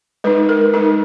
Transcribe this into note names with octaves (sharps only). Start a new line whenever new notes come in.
G#3 D#4 B4
A#4
G#3 D#4 A#4